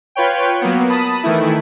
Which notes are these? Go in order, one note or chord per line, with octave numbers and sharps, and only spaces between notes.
F4 B4 C#5 G5
F#3 A#3 B3
A5 B5 D#6
D#3 E3 A3 E4